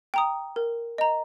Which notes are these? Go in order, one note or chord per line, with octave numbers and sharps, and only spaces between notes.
G5 A#5 D#6
A#4
D#5 A#5